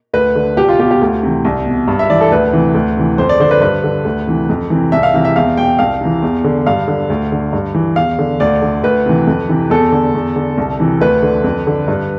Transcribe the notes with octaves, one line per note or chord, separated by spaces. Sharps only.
D2 B4
D3
C2 G4
F4
B2 G4
G4
D2
C3 E3
C2
B2
G2
E5
E3 D5
A4
D2 B4
C3 E3
D2
C3 E3
F2 C5
D5
D3 C5
B4
G2 B4
D3
D2
C3 E3
F2
C3 E3
C2 E5
F5
C3 E3 F5
E5
E2 F5
B2 G5
C2 F5
C3 E3
E2
D3
G2 F5
D3
D2
D3
G2
E3
E2 F5
D3
D2 D5
D3
D2 B4
C3 E3
F2
C3 E3
E2 A4
D3
E2
D3
C2
C3 E3
D2 B4
D3
F2
D3
G2